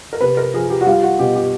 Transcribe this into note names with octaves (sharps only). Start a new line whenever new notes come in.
A#4
C3 B4
A#4
F3 G#4
G4
F#4
G3 F4
F#4
B2 G4
G4